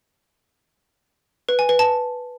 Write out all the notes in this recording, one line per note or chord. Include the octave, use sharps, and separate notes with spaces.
B4
G#5
B4
A5